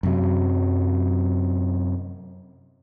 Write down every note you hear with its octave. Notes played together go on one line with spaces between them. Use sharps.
F#2 C3 F#3